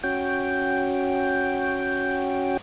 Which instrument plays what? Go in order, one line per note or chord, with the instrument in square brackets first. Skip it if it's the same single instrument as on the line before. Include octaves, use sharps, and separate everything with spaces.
[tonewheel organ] C#4 F#4 G5